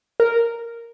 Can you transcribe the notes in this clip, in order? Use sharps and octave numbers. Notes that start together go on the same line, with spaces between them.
A#4